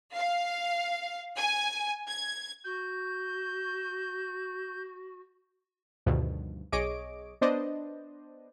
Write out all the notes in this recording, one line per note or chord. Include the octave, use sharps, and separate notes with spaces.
F5
G#5
G#6
F#4 G6
D2 G2 B2 D#3 F3
B1 G#4 C#5 D#5 D6 D7
B3 D4 C5 D5 D#5